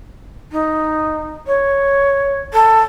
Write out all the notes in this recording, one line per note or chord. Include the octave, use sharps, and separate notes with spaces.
D#4
C#5
A4